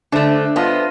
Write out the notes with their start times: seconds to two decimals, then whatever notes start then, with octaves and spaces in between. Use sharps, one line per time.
0.12 D3 A3 D4 C5 E5
0.56 B3 F4 D#5 A5